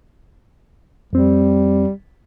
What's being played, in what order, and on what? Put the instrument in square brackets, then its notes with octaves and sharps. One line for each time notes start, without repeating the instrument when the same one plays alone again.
[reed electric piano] F2 C4 [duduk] G3